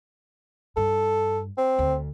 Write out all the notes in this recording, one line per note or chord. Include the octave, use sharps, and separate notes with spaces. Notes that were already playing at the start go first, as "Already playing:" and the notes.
G2 A4
C4
D2